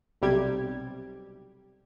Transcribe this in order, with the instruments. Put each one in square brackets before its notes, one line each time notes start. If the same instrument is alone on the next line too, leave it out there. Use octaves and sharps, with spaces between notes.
[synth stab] B1 C3 G3 G4 G#6